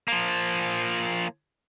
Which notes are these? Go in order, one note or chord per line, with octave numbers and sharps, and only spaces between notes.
F3 A#3